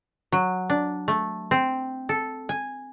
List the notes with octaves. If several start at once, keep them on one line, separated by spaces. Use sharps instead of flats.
F#3
D4
A3
C4
A4
G#5